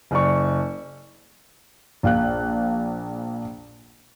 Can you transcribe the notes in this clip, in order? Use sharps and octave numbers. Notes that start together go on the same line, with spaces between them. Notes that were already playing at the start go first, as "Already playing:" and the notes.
F#1 D5 C#6
A#1 F5 F#6